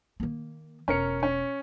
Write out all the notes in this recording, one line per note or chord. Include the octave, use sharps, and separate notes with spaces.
D#3 A#3
E1 C#4 A#4 C#7
C#4